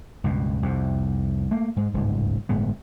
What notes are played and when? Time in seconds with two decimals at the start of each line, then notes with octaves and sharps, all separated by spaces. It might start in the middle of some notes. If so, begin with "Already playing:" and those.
0.24 C#2 G2 B2
0.62 C2 F2 C3
1.51 A3 A#3
1.76 G#2 G#3
1.94 D1 G1 C#2 G#2
2.49 G1 A2 G#3 B3